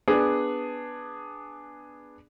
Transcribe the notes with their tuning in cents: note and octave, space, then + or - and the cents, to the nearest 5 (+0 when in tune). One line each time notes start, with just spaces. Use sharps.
B3 +0 D4 +5 G#4 -5